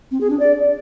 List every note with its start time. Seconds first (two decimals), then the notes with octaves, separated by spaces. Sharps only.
0.11 C4
0.21 G#4
0.30 D4
0.40 D5